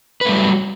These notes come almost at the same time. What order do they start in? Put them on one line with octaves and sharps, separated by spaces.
B4 A3 G3 F#3